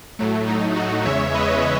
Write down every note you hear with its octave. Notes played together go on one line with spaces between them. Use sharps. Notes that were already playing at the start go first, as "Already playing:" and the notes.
A2 F#3 A3
D#4
D#4 F#4
E2 C#3 G#3 C#5 E5
B4 D#5